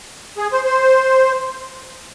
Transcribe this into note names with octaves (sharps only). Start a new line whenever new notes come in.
G#4
C5
C5